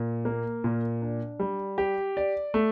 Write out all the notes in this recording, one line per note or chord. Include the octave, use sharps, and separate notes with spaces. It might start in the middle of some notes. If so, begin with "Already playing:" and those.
Already playing: A#2
A#3
A#2
D4
G3
G4
D5
A3